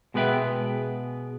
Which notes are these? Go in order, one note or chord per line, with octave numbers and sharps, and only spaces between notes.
B2 G#3 B3 B4 E5 G5